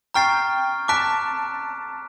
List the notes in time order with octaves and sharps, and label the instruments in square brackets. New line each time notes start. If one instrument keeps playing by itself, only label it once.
[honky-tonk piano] G5 [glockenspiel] A#5 C#6 F6 A6 C7
[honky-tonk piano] A5 [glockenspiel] D6 F#6 B6 D7